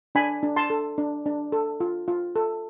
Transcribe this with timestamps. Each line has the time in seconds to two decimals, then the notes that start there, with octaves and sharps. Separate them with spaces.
0.15 D4 G#5 B5
0.43 D4
0.56 A5 C6
0.70 A4
0.98 D4
1.26 D4
1.52 A4
1.80 F4
2.08 F4
2.36 A4